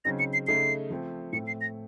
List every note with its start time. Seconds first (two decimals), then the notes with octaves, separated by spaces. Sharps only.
0.05 C#3 F#3 C4 D#4 A#6
0.19 C#7
0.33 C7
0.47 C#3 A3 D#4 C7
0.90 F3 A3 C4
1.33 A2 A3 C4 C#7
1.47 C7
1.61 A#6